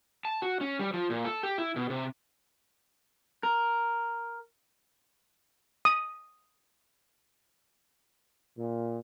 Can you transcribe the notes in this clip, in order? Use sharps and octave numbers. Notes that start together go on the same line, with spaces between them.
A5
F#4
C#4
G3
F3
A#2
A4
G4
E4
B2
C3
A#4
D#6
A#2